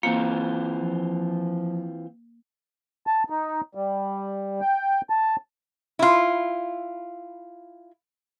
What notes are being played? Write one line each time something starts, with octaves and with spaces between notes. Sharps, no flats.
E3 A#3 C4 F4
F3
A5
D#4
G3
G5
A5
E4 F4